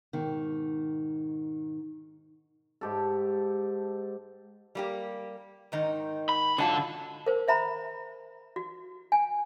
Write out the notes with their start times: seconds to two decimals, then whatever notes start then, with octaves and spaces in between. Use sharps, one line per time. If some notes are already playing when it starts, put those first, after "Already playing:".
0.13 G#2 B2 D#3
2.81 G#2 G4 A4
4.75 G3 A#3 G4
5.72 G#2 D#3 D#4
6.29 B5
6.58 G#2 D3 F#3 F4 A5
7.26 A#4 C5
7.48 C5 E5 A#5 B5
8.56 F#4
9.12 G#5